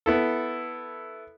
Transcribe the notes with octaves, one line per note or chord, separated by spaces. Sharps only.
B3 E4 A4